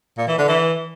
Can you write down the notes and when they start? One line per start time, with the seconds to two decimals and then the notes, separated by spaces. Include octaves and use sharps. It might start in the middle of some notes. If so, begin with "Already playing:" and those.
0.18 A#2
0.28 E3
0.38 D3
0.48 E3